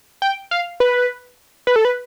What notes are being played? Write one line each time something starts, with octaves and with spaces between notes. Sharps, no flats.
G5
F5
B4
B4
A4
B4